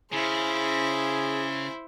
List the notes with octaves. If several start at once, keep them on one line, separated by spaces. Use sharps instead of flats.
C#3 E4 G#4 C5